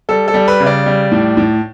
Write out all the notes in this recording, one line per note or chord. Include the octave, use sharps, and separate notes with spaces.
G3 A4
A4
G3
B4
C#3
D5
G3
A2
A2